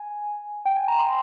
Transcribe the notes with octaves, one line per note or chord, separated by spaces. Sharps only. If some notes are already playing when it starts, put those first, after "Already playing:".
Already playing: G#5
G5
G#5
A#5
C6